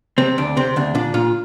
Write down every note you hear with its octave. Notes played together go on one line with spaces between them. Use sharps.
C3 C4
D2 D4
C3 C4
D2 D4
A#2 D4
A#2 F4